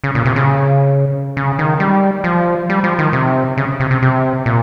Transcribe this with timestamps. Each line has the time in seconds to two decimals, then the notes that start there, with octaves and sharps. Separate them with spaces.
0.04 C#3
0.15 A#2
0.25 C3
0.36 C#3
1.37 C#3
1.59 D#3
1.80 G3
2.24 F3
2.69 G3
2.84 F3
2.99 D#3
3.13 C3
3.58 C#3
3.80 C3
3.91 C3
4.02 C3
4.46 A#2